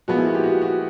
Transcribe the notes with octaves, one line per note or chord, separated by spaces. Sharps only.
A#2 F3 G#3 B3 F#4
E4
F#4
G4
F#4
F#4